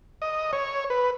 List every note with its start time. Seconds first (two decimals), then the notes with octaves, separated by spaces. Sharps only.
0.22 D#5
0.53 C#5
0.90 B4